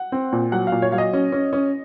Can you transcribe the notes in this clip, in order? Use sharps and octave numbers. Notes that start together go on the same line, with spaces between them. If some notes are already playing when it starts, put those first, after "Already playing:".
Already playing: F#5
C4
A#2
F#3 F#5
F5
A#2
C#5
F#3 F5
D#5
C#4
C#4
C#4